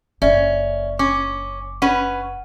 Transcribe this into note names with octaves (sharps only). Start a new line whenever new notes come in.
F#1 C#4 D5 E5
C#4 D6
C#4 B4 F#5 D#7